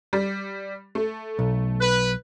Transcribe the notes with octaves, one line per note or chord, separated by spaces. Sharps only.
G3
A3
B1
B4